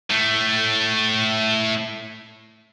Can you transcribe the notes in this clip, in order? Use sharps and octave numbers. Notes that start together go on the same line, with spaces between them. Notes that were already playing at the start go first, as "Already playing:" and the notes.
A2 A3